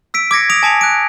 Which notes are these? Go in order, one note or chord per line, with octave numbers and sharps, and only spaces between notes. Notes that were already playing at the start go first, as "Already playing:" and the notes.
E6 B6 D7
D6 G#6 A#6 C#7
D#6 A#6 D7 F7
G#5 A5 D6 B6 C#7 F7
F#6 D7